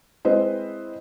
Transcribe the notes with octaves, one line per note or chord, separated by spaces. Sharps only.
G#3 C4 E4 B4 C5 D#5